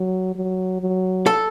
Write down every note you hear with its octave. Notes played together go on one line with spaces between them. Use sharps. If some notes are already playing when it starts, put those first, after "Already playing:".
Already playing: F#3
F#3
F#3
A4